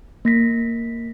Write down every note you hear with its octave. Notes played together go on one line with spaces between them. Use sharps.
A#3 A#6 B6